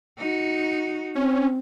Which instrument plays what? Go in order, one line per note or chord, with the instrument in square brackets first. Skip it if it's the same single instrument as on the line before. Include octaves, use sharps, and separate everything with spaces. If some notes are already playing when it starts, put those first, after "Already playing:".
[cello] D#4 F#4
[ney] C4 [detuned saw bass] C#4